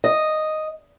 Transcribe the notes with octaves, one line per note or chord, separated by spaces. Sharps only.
D#5